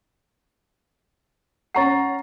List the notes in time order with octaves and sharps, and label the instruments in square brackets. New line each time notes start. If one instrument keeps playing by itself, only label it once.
[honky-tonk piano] C#4 A#5 C7 [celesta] F#5 C#6 A6